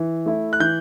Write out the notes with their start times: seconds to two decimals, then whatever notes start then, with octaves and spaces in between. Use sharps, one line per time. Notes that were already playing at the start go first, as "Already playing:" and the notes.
Already playing: E3
0.26 A3 E4
0.53 F#6
0.60 E3 G6